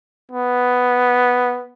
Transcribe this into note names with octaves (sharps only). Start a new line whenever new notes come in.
B3